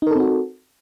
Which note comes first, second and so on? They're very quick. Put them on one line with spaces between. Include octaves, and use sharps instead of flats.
D#4 A#4 A4 C4 F#4